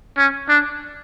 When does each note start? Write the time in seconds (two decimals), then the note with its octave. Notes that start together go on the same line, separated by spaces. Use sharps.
0.17 C#4
0.49 D4